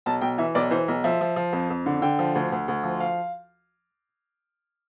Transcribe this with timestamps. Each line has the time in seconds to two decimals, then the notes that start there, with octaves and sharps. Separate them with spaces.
0.06 B1 A5
0.21 B1 G5
0.38 E3 E5
0.55 B1 D5
0.71 E3 C5
0.88 B1
1.04 F3 E5
1.21 F3
1.36 F3
1.53 F2
1.70 F2
1.86 D3
2.02 D3 G5
2.19 F3
2.35 D2
2.52 D2
2.68 D2
2.83 F3
3.00 F5